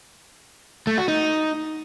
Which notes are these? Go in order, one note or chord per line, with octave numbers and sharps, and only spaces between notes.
A3
F#4
D#4